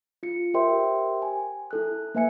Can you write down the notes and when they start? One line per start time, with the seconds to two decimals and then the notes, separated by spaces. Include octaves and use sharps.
0.23 F4 C#7
0.54 G4 A#4 C5 E5 G5 C6
1.22 G#5
1.71 E4 A4 F#6
2.15 A#3 B4 E5 G#5 C#7